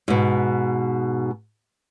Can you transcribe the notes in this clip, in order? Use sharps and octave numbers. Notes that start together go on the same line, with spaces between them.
G#2 B2